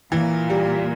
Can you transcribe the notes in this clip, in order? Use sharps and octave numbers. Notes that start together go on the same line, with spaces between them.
A#2 E3
G3